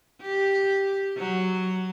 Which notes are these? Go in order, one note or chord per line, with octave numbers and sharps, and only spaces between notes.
G4
F#3